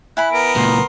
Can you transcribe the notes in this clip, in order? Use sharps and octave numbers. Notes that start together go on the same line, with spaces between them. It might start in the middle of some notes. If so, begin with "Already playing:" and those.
E4 G#5 B5 F#6
B3 A#4 D7
C#2 A#2 C6